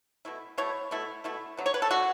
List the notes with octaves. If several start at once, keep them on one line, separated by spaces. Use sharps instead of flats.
B2 A3 E4
B2 A3 E4 C#5
B2 A3 E4
B2 A3 E4
D3 F#3 B3
C#5
B4
A4
D3 F#3 B3 F#4